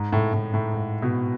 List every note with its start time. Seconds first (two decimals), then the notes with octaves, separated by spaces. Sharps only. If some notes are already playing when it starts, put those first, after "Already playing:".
Already playing: G#2
0.13 A2
0.34 A2
0.54 A2
0.74 G#2
1.02 B2